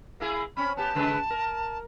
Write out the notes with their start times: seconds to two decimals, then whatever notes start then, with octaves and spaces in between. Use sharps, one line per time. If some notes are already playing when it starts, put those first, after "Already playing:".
0.20 A#3 E4 G#4
0.57 C4 C#4 B5
0.77 B3 G4 A5
0.95 C#3 G#3 B4
1.30 A#4